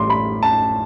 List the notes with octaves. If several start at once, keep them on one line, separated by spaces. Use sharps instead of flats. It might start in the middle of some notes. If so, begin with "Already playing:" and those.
Already playing: A1 A2 G3 C6 D6
B5
A5